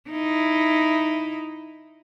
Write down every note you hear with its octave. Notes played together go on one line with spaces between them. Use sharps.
D#4 E4